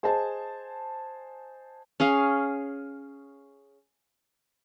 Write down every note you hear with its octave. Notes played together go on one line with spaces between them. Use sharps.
G#4 C5 D#5 G#5 A5
C#4 G#4 F5